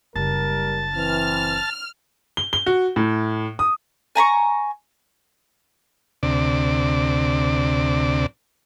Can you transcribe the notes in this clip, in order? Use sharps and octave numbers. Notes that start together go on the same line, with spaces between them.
F#1 G3 A#4 A5
E3 C4 F6
G7
G7
F#4
A2
D#6
G#5 A#5 B5 C#6
D2 C3 D5